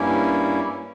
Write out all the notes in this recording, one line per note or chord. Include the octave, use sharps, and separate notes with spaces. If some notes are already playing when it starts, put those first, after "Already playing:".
Already playing: G2 G3 A#3 C#4 E4